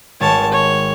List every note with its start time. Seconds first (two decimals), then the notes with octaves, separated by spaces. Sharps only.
0.20 G#1 C#5 A5
0.52 C#5